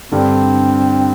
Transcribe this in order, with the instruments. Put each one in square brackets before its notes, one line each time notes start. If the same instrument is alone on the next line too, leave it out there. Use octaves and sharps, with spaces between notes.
[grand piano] G2 D3 G3 [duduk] C4